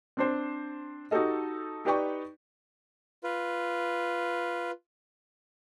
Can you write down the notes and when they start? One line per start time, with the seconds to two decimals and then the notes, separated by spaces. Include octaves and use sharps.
0.17 C4 D4 C5
1.11 D#4 F#4 G4 A4 D#5
1.85 D#4 G4 B4 D5 G5 C#6
3.24 F4 B4